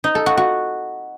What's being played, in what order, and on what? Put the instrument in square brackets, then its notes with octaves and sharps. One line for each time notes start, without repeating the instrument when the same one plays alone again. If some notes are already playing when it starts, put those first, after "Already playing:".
[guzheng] D#4
A4
F#4
F#4